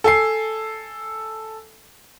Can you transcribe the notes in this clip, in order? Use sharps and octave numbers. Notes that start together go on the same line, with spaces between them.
A4 G#5 C7